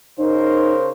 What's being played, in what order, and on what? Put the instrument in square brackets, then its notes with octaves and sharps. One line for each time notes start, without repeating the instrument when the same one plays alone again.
[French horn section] C#3 A#4 C5 [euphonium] D#4